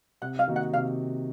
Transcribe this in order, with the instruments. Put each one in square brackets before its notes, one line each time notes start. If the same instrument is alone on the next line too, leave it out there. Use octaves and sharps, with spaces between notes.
[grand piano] C3 [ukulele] F#5
[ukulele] F5
[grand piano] D#3 A#3 D#4 F#4
[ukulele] F#5
[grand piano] C3 [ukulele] F5